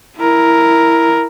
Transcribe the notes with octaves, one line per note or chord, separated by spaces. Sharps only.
E4 A#4